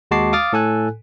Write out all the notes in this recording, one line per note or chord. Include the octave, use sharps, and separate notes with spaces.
D#2 G#3 F#4 A5 D6 C7
F5 D6 D#6 F6 A6
A2 A4 G#5 F#6